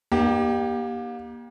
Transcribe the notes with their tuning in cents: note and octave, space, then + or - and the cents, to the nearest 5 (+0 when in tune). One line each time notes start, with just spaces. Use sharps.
A#3 +35 D#4 -30 G4 +0